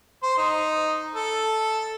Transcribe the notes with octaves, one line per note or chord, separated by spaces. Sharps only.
C5
D#4
A4